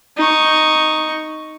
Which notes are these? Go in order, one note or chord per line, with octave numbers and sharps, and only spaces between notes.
D#4 C#6